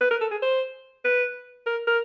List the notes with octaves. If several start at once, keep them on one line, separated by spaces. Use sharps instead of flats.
B4
A#4
A4
G#4
C5
B4
A#4
A#4